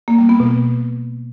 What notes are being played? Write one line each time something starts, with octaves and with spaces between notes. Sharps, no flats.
A#3
G3
B3
B2